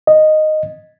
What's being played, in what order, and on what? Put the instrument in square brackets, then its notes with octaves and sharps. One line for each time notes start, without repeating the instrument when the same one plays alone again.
[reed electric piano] D#5